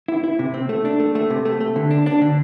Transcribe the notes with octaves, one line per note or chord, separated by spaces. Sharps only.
E4
E4
C3
C4
A3
D4
A3
A3
C3
A3
A3
D3
D4
D4
D3